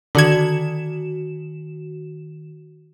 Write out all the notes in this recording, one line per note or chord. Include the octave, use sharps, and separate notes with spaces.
D3 D#3 F#4 G#6 E7